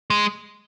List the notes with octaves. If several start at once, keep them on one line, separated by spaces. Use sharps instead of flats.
G#3